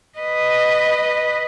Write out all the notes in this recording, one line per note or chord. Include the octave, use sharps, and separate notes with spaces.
B4 D#5